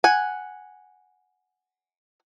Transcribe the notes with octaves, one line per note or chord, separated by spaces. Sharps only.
F#5 G#5